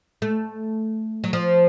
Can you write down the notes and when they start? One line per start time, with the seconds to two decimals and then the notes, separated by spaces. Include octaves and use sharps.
0.22 A3
1.24 F#3
1.33 F3